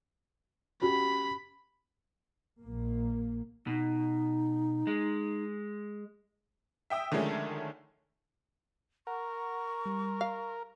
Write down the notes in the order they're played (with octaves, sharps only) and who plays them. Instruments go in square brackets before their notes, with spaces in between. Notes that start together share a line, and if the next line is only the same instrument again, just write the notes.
[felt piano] C#4 F#4 G4 [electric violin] B5
[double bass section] A#1 A#3
[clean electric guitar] B2 [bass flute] D#4
[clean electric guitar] G#3
[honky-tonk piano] E5 G5 D#6 E6
D3 D#3 F3 G#3 A3 C#4
[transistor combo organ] A#4 [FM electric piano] F#5 [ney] C#6
[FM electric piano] G3
[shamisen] F5